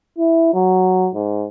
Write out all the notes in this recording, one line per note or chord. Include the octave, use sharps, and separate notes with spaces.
E4
F#3
G#2